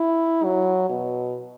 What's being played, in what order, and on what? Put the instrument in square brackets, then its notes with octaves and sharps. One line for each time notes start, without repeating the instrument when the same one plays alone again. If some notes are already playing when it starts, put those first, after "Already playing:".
Already playing: [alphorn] E4
F#3
B2